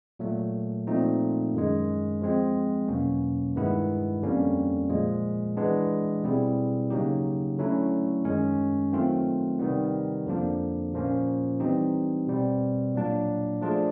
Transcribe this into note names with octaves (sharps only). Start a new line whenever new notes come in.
A#2 F#3 A3
A#2 F3 A3 C4 D#4
F#2 D#3 G#3
F3 G#3 C4
E2 B2 F#3 A#3 C#4
G2 D#3 G#3 B3 E4
F2 D3 G3 A#3 C#4
A#2 F3 G#3
E3 G#3 B3 D4
B2 G3 C4 E4 G#4
C#3 F#3 A#3 D#4 G4
D3 F#3 A3 C#4 E4
F#2 D#3 G#3 C#4
D#3 F#3 A3 C4 F4
C3 D#3 G3 B3
F2 D3 F3 A#3 D4
A#2 F3 A#3 C#4
E3 G3 C4 D#4 G4
B2 G3 C4
A#2 F#3 A#3 D4
F3 A3 D4 F4 G#4